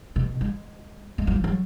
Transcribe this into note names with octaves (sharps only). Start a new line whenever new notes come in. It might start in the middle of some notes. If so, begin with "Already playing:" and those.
B2
G#3
G#3
F#3
F3
F#3